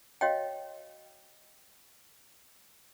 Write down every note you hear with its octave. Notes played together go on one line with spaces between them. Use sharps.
F#4 C#5 D#5 F5 G5